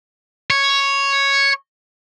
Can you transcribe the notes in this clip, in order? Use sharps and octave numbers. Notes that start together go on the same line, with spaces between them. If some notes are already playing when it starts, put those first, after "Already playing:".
C#5